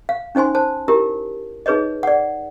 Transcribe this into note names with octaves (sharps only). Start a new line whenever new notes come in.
F5
C#4 D#4 C5 G#5 C6
C5 A5
E4 G4 A#4
D#4 G#4 B4 C#5 D#5
D5 F#5